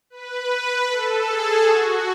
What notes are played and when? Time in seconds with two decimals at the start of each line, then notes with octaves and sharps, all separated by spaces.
0.10 B4
0.87 A4
1.25 G#4
1.64 F#4